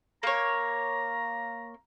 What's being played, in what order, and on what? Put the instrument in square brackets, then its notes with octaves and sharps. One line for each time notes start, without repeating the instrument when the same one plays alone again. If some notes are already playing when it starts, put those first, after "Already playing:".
[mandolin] A#3 C#5 [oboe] A#5